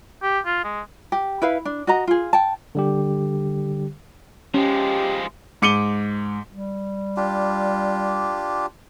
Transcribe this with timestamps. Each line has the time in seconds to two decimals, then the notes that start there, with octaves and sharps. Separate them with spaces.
0.22 G4
0.46 F4
0.64 G#3
1.12 G4
1.42 E4 B4 F5
1.65 D4
1.87 F#4 D#5 A#5
2.07 F4 G#4
2.33 G5 A5
2.75 D3 G3 G4
4.54 F3 G#3 C#4 G4
5.62 G#2 D6 C#7 D#7 G7
6.49 G3
7.17 D4 F4 G4